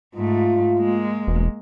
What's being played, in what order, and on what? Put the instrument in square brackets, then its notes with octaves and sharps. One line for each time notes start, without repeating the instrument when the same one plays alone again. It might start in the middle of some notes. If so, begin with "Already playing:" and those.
[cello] G#2 A3 [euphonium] F4
[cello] G#3 A#3
[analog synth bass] E1